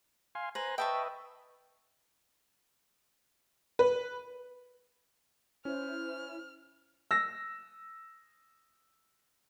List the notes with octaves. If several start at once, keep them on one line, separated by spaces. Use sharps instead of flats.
F5 G#5 C6
B4 C5 G#5 A#5
B4 D#5 E5 G5 A5 C#6
B4
C#4 E4 C5 F6
E6 A#6